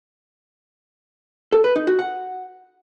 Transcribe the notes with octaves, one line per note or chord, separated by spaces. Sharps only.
A4
B4
D#4
F#4
F#5